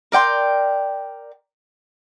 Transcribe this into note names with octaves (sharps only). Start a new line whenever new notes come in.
A#4 D5 G5 C6